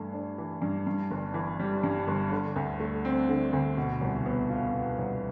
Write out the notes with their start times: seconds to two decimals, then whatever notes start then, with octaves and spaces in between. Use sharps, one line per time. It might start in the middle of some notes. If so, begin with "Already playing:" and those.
Already playing: G2 E3 A3
0.14 D4
0.38 E3
0.62 G2
0.87 G2
1.11 G1
1.34 E3
1.60 G3
1.84 G2
2.08 G1
2.31 D3
2.56 D2
2.79 A3
3.05 C4
3.29 D3
3.53 D2
3.77 B2
4.01 C2
4.26 B3
4.50 F4
4.73 B2
4.98 C2